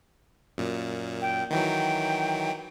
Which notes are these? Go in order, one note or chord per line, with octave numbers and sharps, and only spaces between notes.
F#2 A#2
G5
D#3 E3 F#3 G5